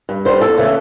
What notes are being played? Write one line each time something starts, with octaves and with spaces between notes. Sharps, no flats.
G2
D3 G3 C5
E2 A4
C#3 E3 A3